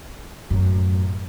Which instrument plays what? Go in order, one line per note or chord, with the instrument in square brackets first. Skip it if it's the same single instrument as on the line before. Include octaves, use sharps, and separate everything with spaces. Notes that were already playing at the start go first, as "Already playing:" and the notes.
[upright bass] F#2 A2